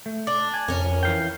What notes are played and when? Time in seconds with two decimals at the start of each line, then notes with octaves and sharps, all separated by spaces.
0.06 A3
0.27 D4 D5
0.54 G#5
0.68 F2 C#4 A#4
1.03 E3 F5 G5